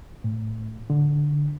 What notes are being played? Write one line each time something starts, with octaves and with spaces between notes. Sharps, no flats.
A2
D3